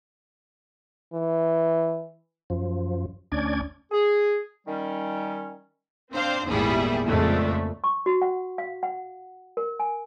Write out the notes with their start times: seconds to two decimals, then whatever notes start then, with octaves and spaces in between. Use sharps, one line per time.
1.14 E3
2.50 F#2 F3
3.32 D2 C#4 D4 D5 G#6
3.92 G#4
4.67 D#3 G3 C#4
6.13 C4 D4 C5 F5
6.47 G#1 E2 A#2 G3 E4 G#4
7.06 F2 A#2 C#3 G#3 A3 D4
7.84 C#6
8.06 F#4
8.22 F#5
8.58 F5
8.83 F#5
9.57 A#4
9.80 G#5